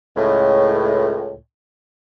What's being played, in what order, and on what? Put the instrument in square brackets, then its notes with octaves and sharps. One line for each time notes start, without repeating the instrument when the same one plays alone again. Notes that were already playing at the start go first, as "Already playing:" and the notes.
[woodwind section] C#2 A2